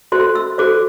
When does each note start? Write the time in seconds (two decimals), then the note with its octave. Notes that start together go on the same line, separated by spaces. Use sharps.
0.12 F#4 A4 C5 C6
0.35 E6
0.58 F#4 A4 C5 D6